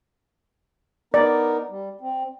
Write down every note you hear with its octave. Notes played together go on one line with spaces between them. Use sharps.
B3 D#4 A#4 D5
G3
C4